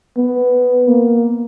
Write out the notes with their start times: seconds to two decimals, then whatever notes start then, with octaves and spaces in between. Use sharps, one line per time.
0.17 B3
0.88 A#3